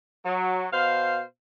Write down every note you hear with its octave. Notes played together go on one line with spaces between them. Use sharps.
F#3
B2 C5 F5